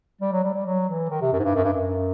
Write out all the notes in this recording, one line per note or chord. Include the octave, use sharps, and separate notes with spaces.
G3
F#3
G3
G3
F#3
E3
D#3
C3
F#2
G#2
G2
F#2
G2
F#2